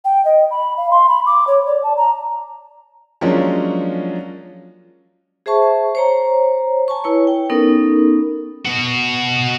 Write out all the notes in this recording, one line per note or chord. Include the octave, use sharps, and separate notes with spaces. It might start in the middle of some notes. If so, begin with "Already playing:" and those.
G5
D#5
B5
F5
C6
B5
D6
C#5
D5
A5
A#5
F3 F#3 G#3 A#3 C#4 D4
G#4 C5 E5 A5 C#6
C5 C#5 A#5
G#5 A5 C#6
E4 B4 C#5
G5
B3 C#4 D#4 A4 A#4
B2 F#4